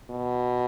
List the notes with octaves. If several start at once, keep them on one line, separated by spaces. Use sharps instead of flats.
B2